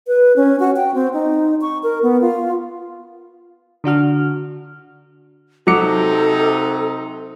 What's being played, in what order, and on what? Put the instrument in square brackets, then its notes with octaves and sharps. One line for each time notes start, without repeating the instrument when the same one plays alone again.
[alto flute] B4
C#4
F#4
G5
C4
D#4
C#6
A#4
B3
F4
[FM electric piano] D3 D4 F#4 F6
[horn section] C3 D#4 [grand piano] F#3 D6 C#7 [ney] A4